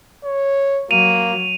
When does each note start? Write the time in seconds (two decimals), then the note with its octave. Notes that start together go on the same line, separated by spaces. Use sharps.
0.25 C#5
0.91 F#3 A#3 D#7 F7